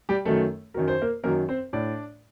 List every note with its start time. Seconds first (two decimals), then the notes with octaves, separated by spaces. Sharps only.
0.09 G3 G4
0.25 F#2 D#3 F#3 A3 A4
0.74 F#2 D#3 F#3 A#4
0.88 C5
1.02 A#3 A#4
1.24 F#2 D#3 F#3 A#3 A#4
1.49 C4 C5
1.73 A2 D4 D5